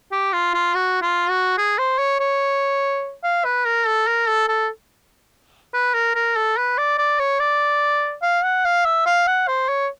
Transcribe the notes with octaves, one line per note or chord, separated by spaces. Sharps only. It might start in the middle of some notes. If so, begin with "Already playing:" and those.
G4
F4
F4
F#4
F4
F#4
G#4
C5
C#5
C#5
F5
B4
A#4
A4
A#4
A4
A4
B4
A#4
A#4
A4
B4
D5
D5
C#5
D5
F5
F#5
F5
E5
F5
F#5
C5
C#5